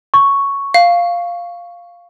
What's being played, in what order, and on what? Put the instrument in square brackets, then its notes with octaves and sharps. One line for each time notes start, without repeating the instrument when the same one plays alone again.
[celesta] C#6
[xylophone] F5